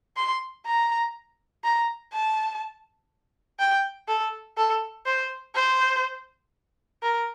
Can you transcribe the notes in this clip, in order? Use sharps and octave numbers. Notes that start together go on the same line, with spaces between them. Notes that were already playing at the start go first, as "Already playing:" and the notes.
C6
A#5
A#5
A5
G5
A4
A4
C5
C5
A#4